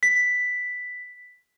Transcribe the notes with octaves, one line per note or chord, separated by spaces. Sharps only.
B6